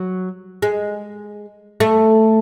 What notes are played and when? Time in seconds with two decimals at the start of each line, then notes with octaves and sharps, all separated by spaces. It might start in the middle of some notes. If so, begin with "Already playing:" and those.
Already playing: F#3
0.62 G#3
1.80 A3